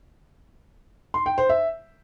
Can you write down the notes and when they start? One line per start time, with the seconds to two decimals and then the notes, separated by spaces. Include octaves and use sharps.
1.14 C6
1.26 G5
1.38 C5
1.49 E5